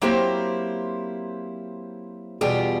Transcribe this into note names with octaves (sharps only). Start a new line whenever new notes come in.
F#3 A#3 C4 E4 G4 C5
E2 B2 G3 F4 G4 G#4